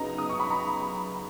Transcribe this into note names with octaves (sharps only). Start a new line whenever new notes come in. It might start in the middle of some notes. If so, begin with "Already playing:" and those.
Already playing: F#2 C#3 F#3 B3 D#4 A#5
D#6
C#6
B5
A#5